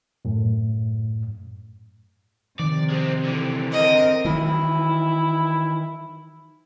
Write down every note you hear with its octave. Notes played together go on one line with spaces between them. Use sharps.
F#2 A2
C3 D#3 F3 D5
G#3 C4
D3 E3
C4 A#4 D#5
D#3 E3 F#3 E4